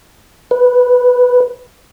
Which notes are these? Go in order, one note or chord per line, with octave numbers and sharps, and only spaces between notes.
B4